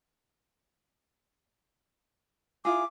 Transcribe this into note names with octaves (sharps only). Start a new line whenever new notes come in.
E4 F4 G#4 D6